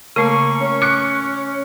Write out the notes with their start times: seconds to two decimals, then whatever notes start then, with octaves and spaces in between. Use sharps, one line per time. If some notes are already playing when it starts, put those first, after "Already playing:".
0.16 C#3 A3 A#3 C#6
0.61 C#4
0.82 D6 F#6 C#7